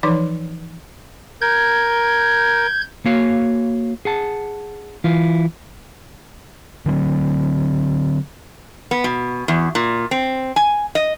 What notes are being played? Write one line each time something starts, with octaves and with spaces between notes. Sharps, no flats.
E3 F3 D#4 C#5 D5 D6
A#4 G6 G#6
A#3 F#4 C#5 F5
G#4 F#5 A5
E3 E4 F4 F5
D3 F#3 G#3 C4
B3
B2
E2
A#2
C4
G#5
D#5